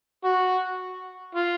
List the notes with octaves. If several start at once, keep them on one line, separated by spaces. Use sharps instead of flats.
F#4
F4